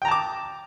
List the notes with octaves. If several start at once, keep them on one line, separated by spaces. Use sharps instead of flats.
G5 A5 A#5 D6